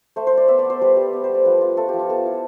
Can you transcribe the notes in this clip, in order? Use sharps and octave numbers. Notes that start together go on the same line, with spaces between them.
A3 C5
C5
A3 D5
B3 E5
D5
B3
C5
G3 B4
G3
B3
C5
G3
D5
F3 B4
F4
A3 A4
G4
F3
F4
B3 A4
E4